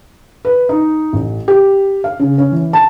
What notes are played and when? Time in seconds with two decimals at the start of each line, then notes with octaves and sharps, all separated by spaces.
0.45 B4
0.69 D#4
1.13 A1
1.48 G4
2.04 F5
2.20 C#3
2.38 C#4
2.52 E3
2.73 A5